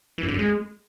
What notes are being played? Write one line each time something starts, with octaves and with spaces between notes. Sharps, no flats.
E3
F#2
D3
F#2
G#3